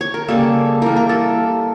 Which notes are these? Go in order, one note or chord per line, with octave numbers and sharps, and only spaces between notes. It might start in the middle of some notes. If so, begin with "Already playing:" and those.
C#5
A#4
C#3 G3 A#3 A4
E3 G3 A#3 A#4
A#4
A4